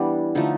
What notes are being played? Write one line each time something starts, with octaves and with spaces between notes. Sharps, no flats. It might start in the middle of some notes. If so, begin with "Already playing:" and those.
Already playing: E3 G3 B3 D4
D3 F3 A3 D#4